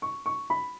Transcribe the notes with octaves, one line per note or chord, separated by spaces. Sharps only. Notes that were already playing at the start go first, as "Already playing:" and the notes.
C#6
C#6
B5